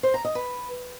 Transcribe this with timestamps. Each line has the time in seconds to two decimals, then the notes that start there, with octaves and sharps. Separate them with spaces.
0.03 C5
0.14 A#5
0.25 D#5
0.35 B4